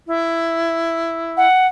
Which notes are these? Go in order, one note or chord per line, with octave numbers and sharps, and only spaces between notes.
E4
F#5